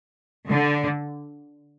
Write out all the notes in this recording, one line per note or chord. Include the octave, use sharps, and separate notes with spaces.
D3